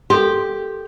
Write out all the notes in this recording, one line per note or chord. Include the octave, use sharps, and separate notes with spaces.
G4 A4 A#4 C6